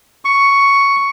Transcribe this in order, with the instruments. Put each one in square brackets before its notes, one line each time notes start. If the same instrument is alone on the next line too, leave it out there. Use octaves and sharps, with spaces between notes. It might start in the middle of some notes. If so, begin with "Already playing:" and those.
[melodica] C#6